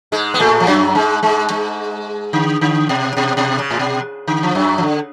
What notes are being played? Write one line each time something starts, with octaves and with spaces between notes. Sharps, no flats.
G#2 G#3
B3
A2 A3
F3
F#2 F#3
G#2 G#3
G#2 G#3
G#2 G#3
D3
D3
B2
B2
B2
C#3
A2
B2
D3
F3
F#2 F#3
F3
D3